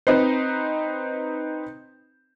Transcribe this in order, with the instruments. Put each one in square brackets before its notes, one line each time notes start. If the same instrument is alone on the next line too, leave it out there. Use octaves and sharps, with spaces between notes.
[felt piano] C4 D#4 B4 C5